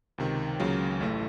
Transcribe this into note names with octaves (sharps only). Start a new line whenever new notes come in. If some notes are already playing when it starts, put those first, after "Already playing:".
C#2 C3 D#3
C#2 C#3 F#3 A#3
A1 A2 A3